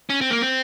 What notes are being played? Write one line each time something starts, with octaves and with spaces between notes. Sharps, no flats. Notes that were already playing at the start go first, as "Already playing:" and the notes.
C#4
C4
A#3
C4